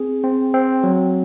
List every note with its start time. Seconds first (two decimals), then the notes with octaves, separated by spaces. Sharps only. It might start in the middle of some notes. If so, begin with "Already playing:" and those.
Already playing: C4 G#4
0.24 C4
0.54 C4
0.84 F#3